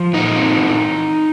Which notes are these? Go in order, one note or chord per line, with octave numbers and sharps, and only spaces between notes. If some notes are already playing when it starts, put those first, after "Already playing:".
Already playing: F3
A#2 D#4
C4
E3